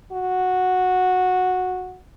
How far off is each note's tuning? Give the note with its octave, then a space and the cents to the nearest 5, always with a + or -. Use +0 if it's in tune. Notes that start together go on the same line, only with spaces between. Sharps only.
F#4 -10